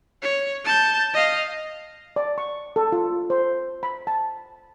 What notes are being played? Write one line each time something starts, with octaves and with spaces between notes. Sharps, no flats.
C#5
A5 G6
D#5 F5
D5
C#6
A4
F4
C5
B5
A5